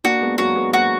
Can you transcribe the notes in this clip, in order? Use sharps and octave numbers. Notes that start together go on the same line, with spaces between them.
A#3 D4 F#4
G#3 B3
F#3 A#3 F#4
G#3 B3
F#3 A#3 F#4